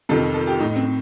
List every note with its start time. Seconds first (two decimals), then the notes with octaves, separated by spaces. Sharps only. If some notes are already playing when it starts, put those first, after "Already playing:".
0.09 F2 C3 D#3 A4
0.34 A4
0.47 G4
0.60 A2 D#4
0.76 C4